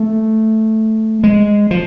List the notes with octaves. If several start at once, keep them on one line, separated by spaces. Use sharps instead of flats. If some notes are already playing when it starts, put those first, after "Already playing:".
Already playing: A3
G#3
F3